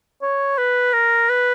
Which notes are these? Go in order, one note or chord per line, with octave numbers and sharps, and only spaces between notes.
C#5
B4
A#4
B4